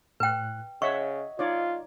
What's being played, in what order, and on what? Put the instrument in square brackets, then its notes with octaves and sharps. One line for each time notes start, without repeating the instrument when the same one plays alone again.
[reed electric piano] A2 F#6 [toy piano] B4 G5
[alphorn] C#3 [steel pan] C#5 E5 F#5 [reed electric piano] D#5 [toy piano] C#6
[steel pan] D#4 C#5 D5 [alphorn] F4